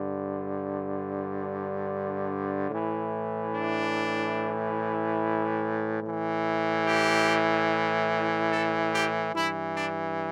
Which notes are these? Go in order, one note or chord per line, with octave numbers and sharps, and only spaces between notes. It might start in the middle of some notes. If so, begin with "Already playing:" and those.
Already playing: G2 D3
A2 E3
D4
A2 E3
G4
A4
G4
G2 E3 E4
D4